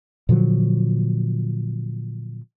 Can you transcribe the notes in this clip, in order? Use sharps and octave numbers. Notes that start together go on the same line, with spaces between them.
A#2 D3 F3 F#3